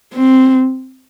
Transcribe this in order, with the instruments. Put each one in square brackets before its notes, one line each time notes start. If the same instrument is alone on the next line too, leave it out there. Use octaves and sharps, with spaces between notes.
[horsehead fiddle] C4